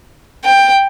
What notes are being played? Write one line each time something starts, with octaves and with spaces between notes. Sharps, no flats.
G5